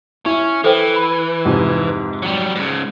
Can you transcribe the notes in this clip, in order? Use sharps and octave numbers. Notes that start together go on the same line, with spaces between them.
C#4 E4
E3 A4 C5 G5
B5
F2 G#2 C3
F#3 G3
G#2 C#3